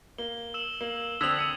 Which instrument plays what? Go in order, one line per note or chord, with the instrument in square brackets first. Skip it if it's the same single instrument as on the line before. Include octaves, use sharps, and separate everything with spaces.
[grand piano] A#3 [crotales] G7
[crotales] E6 E7 F#7
[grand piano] A#3
[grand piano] D3 C4 [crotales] D#6 G#6 B6 [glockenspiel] E6 F7 F#7
[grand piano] C#7 D#7